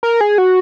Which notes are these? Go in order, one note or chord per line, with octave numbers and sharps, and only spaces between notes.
A#4
G#4
F#4